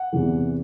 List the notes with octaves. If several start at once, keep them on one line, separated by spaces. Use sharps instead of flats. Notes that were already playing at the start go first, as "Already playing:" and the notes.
Already playing: F#5
E2 C3 E3